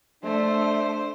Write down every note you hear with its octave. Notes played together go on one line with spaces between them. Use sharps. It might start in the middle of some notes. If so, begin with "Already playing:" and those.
A3 D4 C5